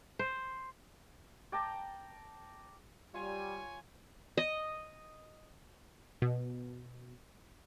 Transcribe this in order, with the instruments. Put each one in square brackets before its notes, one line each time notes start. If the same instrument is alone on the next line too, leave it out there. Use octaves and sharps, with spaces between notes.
[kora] C5
[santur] D5 G5 A5 A#5
[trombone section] G3 [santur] F4 [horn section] C#5 G#5
[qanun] D#5
[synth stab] B2